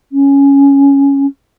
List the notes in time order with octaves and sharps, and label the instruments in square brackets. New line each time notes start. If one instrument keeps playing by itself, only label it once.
[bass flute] C#4